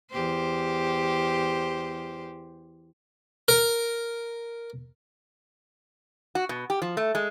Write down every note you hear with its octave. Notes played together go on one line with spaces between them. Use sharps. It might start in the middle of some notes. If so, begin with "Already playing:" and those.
E2 G4 C5
A#4
F#4
B2
G4
F3
A3
G#3